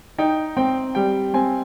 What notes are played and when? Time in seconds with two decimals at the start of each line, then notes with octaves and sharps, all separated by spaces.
0.18 D#4 G5
0.57 C4 G5
0.95 G3 G5
1.34 C4 G#5